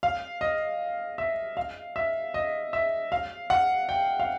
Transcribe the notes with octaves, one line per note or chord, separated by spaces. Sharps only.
F5
D#5
E5
F5
E5
D#5
E5
F5
F#5
G5
F5